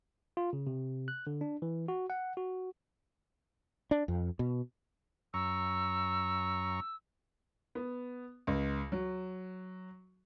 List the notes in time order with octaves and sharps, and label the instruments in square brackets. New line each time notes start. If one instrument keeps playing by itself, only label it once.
[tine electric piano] F4
C#3
C3
F#6
D3
D4
E3
F#4
F#5
F#4
[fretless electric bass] D4
F2
B2
[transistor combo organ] F#2 A#5 C#6 [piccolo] E6
[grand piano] B3
C#2
F#3